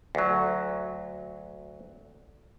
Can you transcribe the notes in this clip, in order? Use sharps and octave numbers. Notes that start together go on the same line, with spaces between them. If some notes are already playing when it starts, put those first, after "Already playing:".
D2 F#3